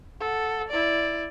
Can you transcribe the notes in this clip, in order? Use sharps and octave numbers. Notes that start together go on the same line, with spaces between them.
A4 F#5
E4 D5